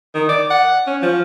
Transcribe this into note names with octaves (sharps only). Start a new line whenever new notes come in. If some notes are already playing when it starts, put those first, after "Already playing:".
D#3
D5
F#5
C#4
F3